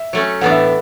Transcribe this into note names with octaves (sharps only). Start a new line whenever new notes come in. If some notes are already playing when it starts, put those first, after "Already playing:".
Already playing: E5
F#3 A3 C#4
A2 E3 B3 D4 F#5
E5